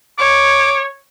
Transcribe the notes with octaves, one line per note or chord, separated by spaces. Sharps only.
C#5 D6